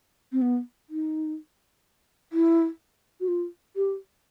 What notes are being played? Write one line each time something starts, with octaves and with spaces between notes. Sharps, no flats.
C4
B3
D#4
E4
F#4
F4
G4